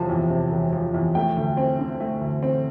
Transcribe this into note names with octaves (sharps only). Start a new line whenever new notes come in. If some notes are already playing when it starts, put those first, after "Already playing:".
Already playing: E1 C3 F3 A5
E2
C3
E1
F3
E2
A3 G5
D2
C4
D3
A3
D2
C4